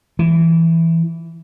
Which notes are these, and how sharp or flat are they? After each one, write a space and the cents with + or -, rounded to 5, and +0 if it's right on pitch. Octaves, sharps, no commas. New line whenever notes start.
E3 +5